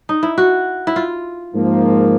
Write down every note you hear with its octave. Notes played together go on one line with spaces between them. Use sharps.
D#4
E4
F#4
E4
F4
G#2 F3 A#3